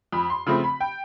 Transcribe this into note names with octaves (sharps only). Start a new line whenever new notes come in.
F2 B5
C6
C#3 F3 A3 C4 B5
B5
G5